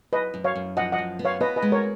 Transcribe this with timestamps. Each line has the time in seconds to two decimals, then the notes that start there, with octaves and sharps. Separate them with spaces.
0.13 F#2 B4 D#5
0.34 F#2
0.44 C#5 F5
0.56 F#2
0.77 F3 D#5 F#5
0.92 D#5 F#5
0.98 F#2
1.19 B3
1.25 C#5 F5
1.40 B3 B4 D#5
1.56 B4 D#5
1.62 G#3
1.72 A#4 C#5